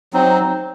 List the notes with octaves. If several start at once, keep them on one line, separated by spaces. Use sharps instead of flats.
F#3 C4 D#4